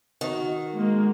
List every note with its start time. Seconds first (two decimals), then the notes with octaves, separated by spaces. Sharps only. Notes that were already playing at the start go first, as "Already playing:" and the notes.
0.21 D#3 F#4
0.75 G#3 A#3